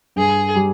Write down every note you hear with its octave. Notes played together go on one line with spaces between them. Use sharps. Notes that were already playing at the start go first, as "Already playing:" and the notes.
G2 G#4
G3